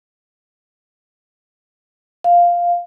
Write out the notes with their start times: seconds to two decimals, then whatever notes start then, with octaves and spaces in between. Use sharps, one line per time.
2.24 F5